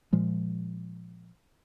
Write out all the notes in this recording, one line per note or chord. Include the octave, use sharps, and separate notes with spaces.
A#2 F3 G#3